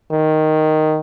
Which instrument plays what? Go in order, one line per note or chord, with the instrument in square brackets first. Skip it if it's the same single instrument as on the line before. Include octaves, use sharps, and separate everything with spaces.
[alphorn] D#3